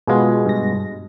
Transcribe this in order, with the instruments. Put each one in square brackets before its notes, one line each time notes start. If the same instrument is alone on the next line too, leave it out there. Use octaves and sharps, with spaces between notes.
[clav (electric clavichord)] B2 G#3 [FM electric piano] B3 F4 G#4
[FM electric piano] G2 A#6